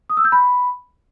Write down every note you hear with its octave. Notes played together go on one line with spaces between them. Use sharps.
D#6
E6
G6
B5